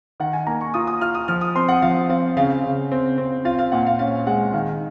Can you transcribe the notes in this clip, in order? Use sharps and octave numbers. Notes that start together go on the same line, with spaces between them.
D#3 F#5
G#5
A#3 A#5
C#6
F4 D#6
D#6
F4 F6
D#6
F3 F6
D#6
C4 C6
F#5
F3 F5
C4 F5
C#3 F5
C#3
C4
C4
F4 F5
F5
A#2 F#5
F5
C#4 F5
G#3 F#5
D#3 F5